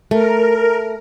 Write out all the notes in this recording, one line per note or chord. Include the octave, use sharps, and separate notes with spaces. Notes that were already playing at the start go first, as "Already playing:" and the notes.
A3 A#4